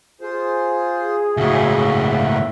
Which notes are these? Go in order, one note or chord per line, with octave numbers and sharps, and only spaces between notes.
F4 G#4 C5
C#2 A2 F#4 E5